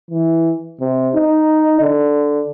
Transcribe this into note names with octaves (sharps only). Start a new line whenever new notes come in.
E3
C3
D#4
D3